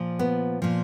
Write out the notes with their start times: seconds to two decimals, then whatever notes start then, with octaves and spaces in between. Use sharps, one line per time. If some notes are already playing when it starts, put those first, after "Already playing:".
Already playing: A#2 F3
0.19 B3
0.62 A#2 F3